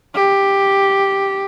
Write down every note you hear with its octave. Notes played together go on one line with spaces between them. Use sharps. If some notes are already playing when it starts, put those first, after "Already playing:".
G4